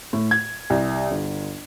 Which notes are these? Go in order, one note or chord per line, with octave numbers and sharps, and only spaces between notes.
A2
G#6
C2
G1